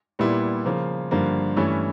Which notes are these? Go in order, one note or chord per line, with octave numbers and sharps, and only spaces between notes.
A#2 G3 B3 E4
C#3 F3 A#3
G2 D3 F3 A#3
G2 E3 A3 C#4 E4